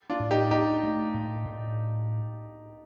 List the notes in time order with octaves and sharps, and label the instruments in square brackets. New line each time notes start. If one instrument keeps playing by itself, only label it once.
[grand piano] D4 F4
[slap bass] A2
[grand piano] D#4 G4
[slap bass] D4 [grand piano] D#4 G4
[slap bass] A3
A2
A2